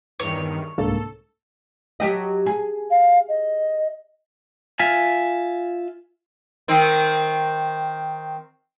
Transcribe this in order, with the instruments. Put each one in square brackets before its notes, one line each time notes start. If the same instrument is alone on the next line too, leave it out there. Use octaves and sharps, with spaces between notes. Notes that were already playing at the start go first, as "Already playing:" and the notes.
[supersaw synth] E2 G2 D#3 [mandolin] C#5
[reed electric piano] C2 G#2 A#3 [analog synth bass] D3 [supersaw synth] A4
[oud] F#3 G4 D#5
G#4
[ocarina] F5
D#5
[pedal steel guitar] F4 E5 G#5
[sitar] D#3 C4